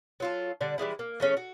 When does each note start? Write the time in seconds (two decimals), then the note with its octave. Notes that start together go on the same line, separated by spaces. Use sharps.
0.20 F#3 F4 A4
0.61 D3 G3 D4
0.78 E3 G3 G#3 E4
0.99 A#3
1.20 E3 A3 C#4 G#4
1.37 F#4